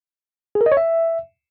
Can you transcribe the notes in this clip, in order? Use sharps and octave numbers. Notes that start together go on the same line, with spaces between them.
G#4
A#4
D#5
C#5
E5